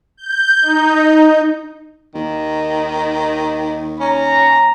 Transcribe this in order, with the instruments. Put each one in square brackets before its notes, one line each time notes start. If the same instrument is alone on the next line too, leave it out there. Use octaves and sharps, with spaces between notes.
[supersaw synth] G6
D#4
[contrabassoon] D#2 [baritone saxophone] D#3
[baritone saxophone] C#4 [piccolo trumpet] A#5